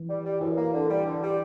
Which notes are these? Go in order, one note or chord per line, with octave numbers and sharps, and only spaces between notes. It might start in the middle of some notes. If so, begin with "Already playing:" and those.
Already playing: E3
G3
G3
F#2 E3
A#3
D3
G3
D3
G3